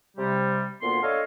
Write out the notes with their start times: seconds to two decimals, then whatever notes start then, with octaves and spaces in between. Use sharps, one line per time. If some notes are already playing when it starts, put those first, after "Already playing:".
0.17 C3 G3
0.82 D2 A#2 A#3 B3 C6
1.02 D4 A4 C#5 D#5 F5